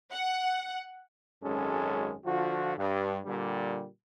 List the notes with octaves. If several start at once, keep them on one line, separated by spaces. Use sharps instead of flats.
F#5
G#1 F#2 G#3 C#4 A4
D3 F3 F4 F#4
G2
A#2 D3 G3